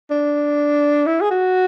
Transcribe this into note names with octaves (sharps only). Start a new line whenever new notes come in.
D4
E4
G#4
F#4